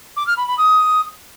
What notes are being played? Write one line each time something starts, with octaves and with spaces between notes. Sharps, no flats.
D6
F6
B5
B5
D#6